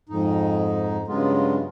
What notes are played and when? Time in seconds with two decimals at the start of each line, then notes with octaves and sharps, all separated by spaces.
0.09 F2 G#2 D#4
1.08 G2 C#3 F#3 G#3 B3 F4